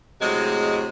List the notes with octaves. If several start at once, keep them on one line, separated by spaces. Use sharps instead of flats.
A2 C3 F#3 G#3